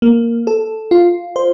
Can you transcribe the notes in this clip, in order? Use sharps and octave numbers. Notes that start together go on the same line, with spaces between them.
A#3
A4
F4
C5